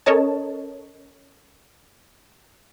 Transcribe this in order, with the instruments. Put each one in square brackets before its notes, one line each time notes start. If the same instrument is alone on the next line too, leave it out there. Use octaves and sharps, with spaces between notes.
[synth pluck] C#4 A4 A#4 C#5 D#5 A5